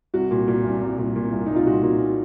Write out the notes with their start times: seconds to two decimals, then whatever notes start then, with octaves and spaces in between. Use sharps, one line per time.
0.14 C2 F#4
0.31 A#2
0.48 A#2
0.65 C2
0.81 C2
0.98 A#2
1.16 A#2
1.32 C2
1.46 C2 D#4
1.56 F4
1.66 A#2 F#4
1.83 A#2